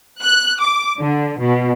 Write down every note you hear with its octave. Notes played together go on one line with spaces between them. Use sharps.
F#6
D6
D3
B2